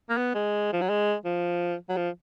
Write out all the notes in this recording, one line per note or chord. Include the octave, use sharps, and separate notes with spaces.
A#3
B3
G#3
F3
F#3
G#3
F3
F#3
F3